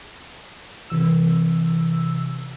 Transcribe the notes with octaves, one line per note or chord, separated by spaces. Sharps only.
C3 E3 E6